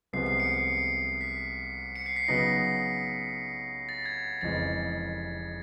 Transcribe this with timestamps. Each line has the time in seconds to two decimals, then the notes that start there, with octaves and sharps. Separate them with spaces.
0.13 C2 C3 F3 G#3 B3 C7
0.26 C7
0.40 C#7
0.54 C7
1.21 B6
1.96 C#7
2.06 C7
2.16 B6
2.28 C#3 F#3 B3 D#4 A#6
3.89 A6
4.06 G#6
4.41 F1 F2 C#3 E3 G#3 A6